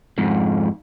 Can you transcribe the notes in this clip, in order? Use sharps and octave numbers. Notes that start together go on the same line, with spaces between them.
F2 G#2